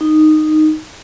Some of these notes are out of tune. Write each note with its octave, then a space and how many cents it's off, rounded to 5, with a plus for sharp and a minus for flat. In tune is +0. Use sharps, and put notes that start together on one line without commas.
D#4 -10